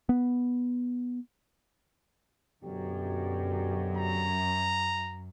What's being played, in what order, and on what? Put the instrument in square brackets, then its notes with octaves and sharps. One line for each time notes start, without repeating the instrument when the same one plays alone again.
[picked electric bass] B3
[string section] F#2 [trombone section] B2 D3 G4
[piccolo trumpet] A#5